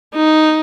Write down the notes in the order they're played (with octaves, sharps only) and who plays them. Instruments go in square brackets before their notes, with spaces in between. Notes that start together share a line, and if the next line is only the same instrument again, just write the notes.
[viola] D#4